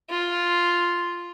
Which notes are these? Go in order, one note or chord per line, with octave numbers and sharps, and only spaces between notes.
F4